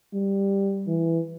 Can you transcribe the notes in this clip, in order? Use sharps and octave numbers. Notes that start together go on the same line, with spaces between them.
G3
E3